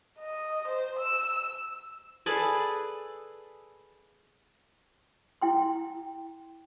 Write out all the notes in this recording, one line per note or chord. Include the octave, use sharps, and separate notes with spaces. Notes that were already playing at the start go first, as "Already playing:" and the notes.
D#5
C5
E6
G#4 A4 B4 D5
E4 G5 C6